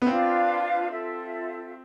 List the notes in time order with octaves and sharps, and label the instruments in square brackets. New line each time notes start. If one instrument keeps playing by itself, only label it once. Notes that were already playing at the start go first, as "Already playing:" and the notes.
[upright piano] B3
[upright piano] C4 [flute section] D4 F4 B4 F5
[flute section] F4 A4 E5